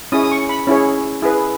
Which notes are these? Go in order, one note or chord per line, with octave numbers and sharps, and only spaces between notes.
C#4 E4 G#4 C#5 D#6
D#6
C#6
B5
C#4 E4 G#4 C#5
E4 G#4 B4